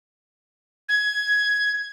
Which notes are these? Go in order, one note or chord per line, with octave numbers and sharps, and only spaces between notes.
G#6